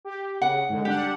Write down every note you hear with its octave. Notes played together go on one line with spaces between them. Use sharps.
G4
C#3 F#5
G#2 D3
G3 D4 G4 F#5